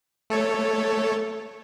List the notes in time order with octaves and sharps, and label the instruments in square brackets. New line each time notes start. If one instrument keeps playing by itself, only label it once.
[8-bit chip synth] A3 A4 C#5